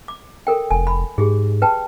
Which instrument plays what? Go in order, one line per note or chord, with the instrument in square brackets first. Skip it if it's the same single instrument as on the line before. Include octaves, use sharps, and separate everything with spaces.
[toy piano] D6
A4 A#4 G5
[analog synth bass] F1 [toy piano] G#5
[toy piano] B5
[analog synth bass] G#2 [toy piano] G4 G#4
[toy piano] B4 G5 A5